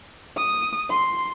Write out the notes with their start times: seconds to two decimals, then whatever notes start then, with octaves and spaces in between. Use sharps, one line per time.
0.37 D#6
0.90 C6